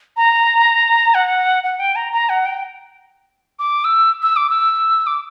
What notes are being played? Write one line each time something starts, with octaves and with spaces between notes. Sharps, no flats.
A#5
F#5
F#5
G5
A#5
A#5
F#5
G5
D6
E6
E6
D6
E6
D6